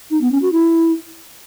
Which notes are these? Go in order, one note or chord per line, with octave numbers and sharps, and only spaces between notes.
D#4
B3
C#4
F#4
E4